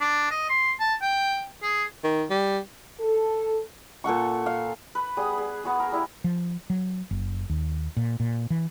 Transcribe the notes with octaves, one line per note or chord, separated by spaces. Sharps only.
D4
D#5
C6
A5
G5
G#4
D#3
G3
A4
A#2 A4 F#5 C#6
F5
B4
G3 B3 G#4 D#6
G#4
B3 F#4 G#4
A#4
G3 E4
F3
F#3
F#1
D#2
A#2
A#2
E3